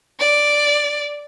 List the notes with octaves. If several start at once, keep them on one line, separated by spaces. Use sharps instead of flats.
D5